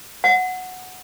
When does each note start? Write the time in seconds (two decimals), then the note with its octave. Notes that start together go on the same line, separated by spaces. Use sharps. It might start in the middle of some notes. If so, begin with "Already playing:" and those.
0.24 F#5